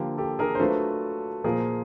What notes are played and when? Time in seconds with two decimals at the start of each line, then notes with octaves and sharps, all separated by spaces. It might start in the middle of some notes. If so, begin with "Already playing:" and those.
Already playing: D3 F3 A#3 G4
0.18 G4 A4
0.39 G#4 A#4
0.55 C5
0.60 F#3 A3 D4 F4 A4 B4
1.44 A#2 F3 A#3 G#4 A#4